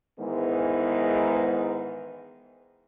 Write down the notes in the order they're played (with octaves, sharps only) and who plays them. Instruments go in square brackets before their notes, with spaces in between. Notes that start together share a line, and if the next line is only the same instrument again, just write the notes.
[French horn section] G#2 D#3 E3 G#3 B3